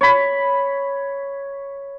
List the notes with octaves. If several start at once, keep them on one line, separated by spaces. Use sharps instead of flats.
C#5 B5